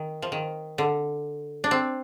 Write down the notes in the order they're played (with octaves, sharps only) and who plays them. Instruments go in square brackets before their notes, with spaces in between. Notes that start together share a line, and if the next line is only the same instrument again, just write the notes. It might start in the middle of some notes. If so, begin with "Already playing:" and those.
Already playing: [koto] D#3
F3
D#3
D3
D4
C4